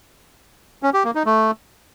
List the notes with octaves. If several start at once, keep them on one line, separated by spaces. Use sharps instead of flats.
C#4
G4
A#3
D#4
A3